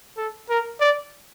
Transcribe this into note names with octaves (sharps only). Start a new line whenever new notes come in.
A4
A#4
D5